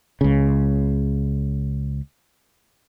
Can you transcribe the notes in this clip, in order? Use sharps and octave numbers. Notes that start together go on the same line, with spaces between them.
C#2 C#3